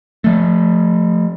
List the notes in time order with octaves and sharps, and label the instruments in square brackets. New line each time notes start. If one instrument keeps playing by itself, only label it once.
[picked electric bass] F3 A3